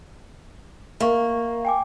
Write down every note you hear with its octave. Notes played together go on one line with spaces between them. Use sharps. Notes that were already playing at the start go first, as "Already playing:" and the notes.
A#3 E5 F5 C#6
G5 G#5 D6